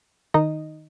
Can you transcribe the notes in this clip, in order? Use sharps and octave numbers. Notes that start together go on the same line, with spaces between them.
D#3 D#4 D#5